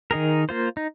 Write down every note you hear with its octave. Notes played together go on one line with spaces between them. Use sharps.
D#3 D#4 G#4 A#4
A#3 F4 C5
D#4